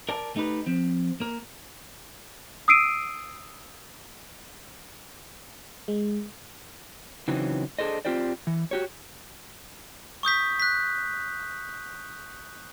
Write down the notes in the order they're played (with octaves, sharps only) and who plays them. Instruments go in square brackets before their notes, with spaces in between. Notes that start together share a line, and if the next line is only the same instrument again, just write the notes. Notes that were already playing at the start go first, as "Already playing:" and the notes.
[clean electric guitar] A#4 D5 G#5 A5
A3 D#4 G4 B4
F3 C4
A#3 A#4
[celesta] D#6 E6 C7 D7 D#7
[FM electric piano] G#3
[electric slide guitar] C#3 E3 F#3 C4 D#4
D4 G#4 A4 C5 D#5
C4 C#4 F4 G4 C5 D5
E3
F#4 G4 C#5
[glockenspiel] C#6 D#6 G6 B6
F#6 B6